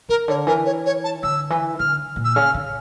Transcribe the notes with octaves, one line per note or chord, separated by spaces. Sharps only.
C#3 A#4
D3 C#5
E3 A#4
C#5
C#5
A5
D3 E6
E3
D3 F6
A#2
E6
C#3 F6
C#3